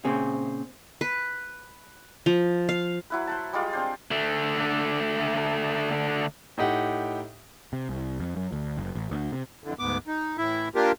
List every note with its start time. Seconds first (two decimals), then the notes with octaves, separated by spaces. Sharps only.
0.05 A#2 C#3 C4 G#4
1.01 B4
2.26 F3
2.69 F5
3.10 F#3 E4 B4
3.27 C5 F#5 A5
3.53 G3 G#3 F4 D5
3.73 C4 D4 C5
4.11 D3 A3
6.58 A2 D#4 G4 F#5
7.73 C3
7.89 C2
8.20 F2
8.36 F#2
8.52 D2
8.77 F#1
8.95 A1
9.11 D2
9.32 C3
9.64 F2 D3 E3
9.79 D2 G#2 B3 D6
10.07 D#4
10.38 A2 E3 E4 E5
10.75 A#3 D4 F4 G4 A#4